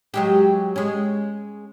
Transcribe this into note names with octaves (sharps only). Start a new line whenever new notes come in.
F#3 G#3 G4
G#3 C#4